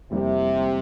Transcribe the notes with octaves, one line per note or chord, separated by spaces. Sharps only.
F2 C3 E3 G3 A#3 E4